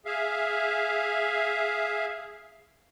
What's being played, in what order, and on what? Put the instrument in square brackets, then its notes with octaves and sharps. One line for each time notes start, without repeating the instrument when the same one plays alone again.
[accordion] G#4 E5 F5